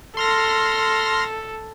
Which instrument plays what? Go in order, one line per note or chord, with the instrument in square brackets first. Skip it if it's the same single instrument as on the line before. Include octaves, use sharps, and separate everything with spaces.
[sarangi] A4 [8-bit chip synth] C6 F6 A#6